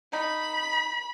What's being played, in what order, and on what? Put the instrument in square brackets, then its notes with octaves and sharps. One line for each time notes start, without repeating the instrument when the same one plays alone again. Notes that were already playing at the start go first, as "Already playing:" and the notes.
[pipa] D#4 [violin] B5